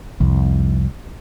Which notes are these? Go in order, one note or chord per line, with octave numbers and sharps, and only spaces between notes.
C2 F2